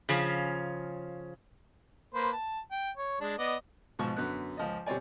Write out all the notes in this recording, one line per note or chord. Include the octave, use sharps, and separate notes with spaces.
C#3 F3 C#4
A#3 B4 C5
A5
G5
C#5
G#3 D4
B3 D5 D#5
G#2 B2 F3 C#6
F#2 D3 B3 F#6
C#2 F3 D#5
B2 G3 C4 C#5 D5 G#5